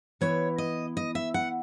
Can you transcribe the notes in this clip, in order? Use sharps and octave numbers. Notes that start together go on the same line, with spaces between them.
E3 B3 E4 C#5
D#5
D#5
E5
F#5